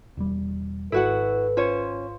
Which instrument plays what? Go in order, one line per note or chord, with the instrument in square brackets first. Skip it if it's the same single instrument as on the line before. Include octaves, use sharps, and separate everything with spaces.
[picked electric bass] E1 G3
[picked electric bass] G#1 [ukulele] E4 F#4 F#5 [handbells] A4 [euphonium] B4
[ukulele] C#4 C5 C#5 [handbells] F4